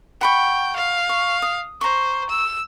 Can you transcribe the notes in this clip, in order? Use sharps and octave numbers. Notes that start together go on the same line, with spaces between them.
F#5 G5 B5 C#6
F5
C#6
D#6
C5 A#5 C#6
E6